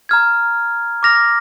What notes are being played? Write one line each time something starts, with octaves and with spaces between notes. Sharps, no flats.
A#5 F6 G#6
D6 F6 A#6 F7